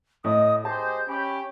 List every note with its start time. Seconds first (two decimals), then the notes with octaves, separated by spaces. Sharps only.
0.24 A2 D#5 D#6
0.65 G4 G#4 C5 D#5 A5 G6
1.08 C#4 G4 B5